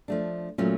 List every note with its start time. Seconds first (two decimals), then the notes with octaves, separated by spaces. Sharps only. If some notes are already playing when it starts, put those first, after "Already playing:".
0.08 F3 A3 D4
0.58 A#2 F#3 A3 C#4 F4